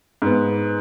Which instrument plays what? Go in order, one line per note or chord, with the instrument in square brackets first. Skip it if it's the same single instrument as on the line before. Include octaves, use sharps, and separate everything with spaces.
[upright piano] G#2 B3